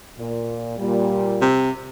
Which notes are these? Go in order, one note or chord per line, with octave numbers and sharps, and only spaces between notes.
A#2
A#2 G3
C3